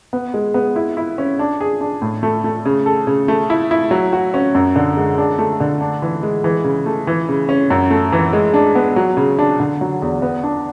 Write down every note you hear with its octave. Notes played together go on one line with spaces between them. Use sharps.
B3
G#3
B3
E4
E4
C#4
D4
G#4
D4
A2
A3
A3
C#3
A4
C#3
A3
E4
E4
F#3
F#4
C#4
F#2
D3
G#3
D4
A3
D3
D4
E3
G#3
E3
C#3
A3
E3
C#3
C#4
F#2
A3
E3
G#3
D4
B3
F#3
C#3
D4
D3
F#3
E2
B3
D4